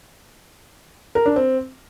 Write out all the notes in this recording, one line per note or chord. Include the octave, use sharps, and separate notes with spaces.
A#4
D4
C4